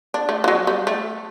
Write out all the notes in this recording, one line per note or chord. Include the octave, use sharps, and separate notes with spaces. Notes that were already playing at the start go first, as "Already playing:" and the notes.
D4
A3
E3
F#3
G3
A3